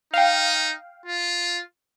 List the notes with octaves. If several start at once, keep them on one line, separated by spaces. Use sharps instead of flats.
D#4 F5 G5
F4